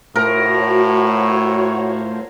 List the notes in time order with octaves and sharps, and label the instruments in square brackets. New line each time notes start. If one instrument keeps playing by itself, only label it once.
[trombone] A2 [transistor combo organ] A3 F4 C5 [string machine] F#4 C#5 [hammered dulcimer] A#4